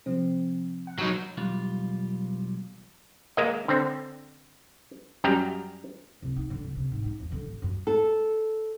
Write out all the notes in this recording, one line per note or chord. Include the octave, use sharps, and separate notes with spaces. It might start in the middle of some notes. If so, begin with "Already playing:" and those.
C3 F3 C4
F#5
F#3 D#4
B1 E2 G3 F4
G#3 A#3 D#5
D3 C4
F#2 G3 G5 A#5
C2
D#4
D3
C#2
C3
G#2
D#4
E2
D3
A1
F#2
A4